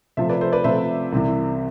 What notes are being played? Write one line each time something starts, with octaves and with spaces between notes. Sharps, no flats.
C3 F3 A3 C5 E5
B4 D5
A4 C5
B4 D5
C3 F3 A3 C5 E5
C2 C3 E3